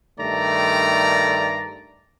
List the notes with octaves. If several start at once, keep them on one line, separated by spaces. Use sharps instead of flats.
G2 D#3 A3 D5 A#5